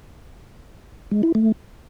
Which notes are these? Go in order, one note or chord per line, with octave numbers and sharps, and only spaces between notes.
G#3
E4
A3